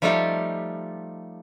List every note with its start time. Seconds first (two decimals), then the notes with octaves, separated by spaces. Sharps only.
0.02 F3 G3 A3 D#4 F4 G4